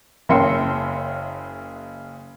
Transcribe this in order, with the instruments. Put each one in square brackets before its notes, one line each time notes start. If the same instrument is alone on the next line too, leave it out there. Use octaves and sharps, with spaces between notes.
[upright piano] F#1 C#3 E5 G5 C6 C#7